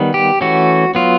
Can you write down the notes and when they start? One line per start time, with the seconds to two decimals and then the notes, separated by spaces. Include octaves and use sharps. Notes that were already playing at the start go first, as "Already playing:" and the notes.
Already playing: D#3 G3 B3
0.14 G4
0.41 E3 A3 C#4 F#4
0.95 F#3 B3 F4